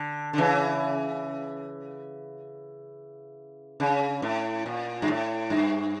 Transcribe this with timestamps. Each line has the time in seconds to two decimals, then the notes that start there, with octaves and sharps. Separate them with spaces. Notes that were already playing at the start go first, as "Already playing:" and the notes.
Already playing: D3
0.33 D3
0.38 C#3 E3
3.80 C#3
4.22 A2
4.66 A#2
5.02 G2
5.08 A2
5.50 G2